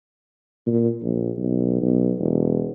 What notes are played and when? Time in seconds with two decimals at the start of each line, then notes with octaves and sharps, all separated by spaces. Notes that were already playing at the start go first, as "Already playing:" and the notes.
0.66 A#2
1.02 A#1
1.37 B1
1.81 B1
2.18 E1